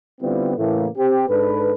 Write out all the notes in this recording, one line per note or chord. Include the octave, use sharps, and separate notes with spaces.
D3 G3 B3 C4 E4 F4
A2 C#3 E3 A3 A#3
C4 G4
G#2 D4 A4 B4